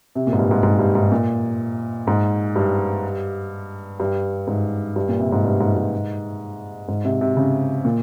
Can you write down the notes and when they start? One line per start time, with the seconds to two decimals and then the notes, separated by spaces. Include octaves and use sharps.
0.15 C3
0.27 A#2
0.33 G#2
0.39 G2
0.51 G#2
0.63 G#2
0.79 G2
0.95 G#2
1.12 A#2
2.07 G#2
2.56 G2
4.00 G2
4.47 G#2
4.96 G2
5.09 A#2
5.20 C3
5.32 G#2
5.44 G2
5.60 G#2
5.76 G#2
6.88 G#2
7.05 C3
7.21 C3
7.37 C#3
7.85 A#2